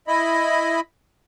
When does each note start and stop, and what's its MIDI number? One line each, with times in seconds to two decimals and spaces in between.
0.08 0.80 64
0.08 0.80 75
0.08 0.80 83